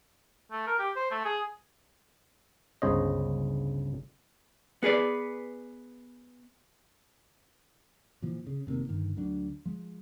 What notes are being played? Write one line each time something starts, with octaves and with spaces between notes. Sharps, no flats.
A3
A#4
G4
C5
A3
G#4
G1 C#2 C#3 C5 C#5 D#5
B3 G#4 B4 D5
A#2 E3 F3
C#3
F1 C3 D#3 A#3
G2 D3 D#3
D2 F#3 D4
F3 G#3